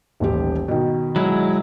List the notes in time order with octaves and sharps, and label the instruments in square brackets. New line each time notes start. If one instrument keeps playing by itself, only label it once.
[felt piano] D#1 A1 G4
B2 D#3
[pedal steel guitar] F#3 G#3 E4